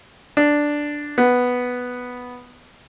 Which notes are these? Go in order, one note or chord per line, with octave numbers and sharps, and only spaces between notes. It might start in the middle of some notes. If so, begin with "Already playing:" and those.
D4
B3